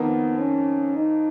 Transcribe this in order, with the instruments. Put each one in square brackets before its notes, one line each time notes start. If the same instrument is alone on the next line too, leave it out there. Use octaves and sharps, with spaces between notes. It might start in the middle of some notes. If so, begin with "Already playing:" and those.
Already playing: [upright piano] F2 D#3 A#3 [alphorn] B3
[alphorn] C#4
D#4